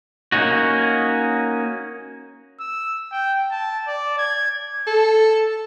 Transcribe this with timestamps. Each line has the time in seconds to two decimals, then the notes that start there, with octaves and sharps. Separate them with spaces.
0.32 A#3 C#4 D#4 F#4
2.60 E6
3.12 G5
3.51 A5
3.87 D5
4.18 G#6
4.87 A4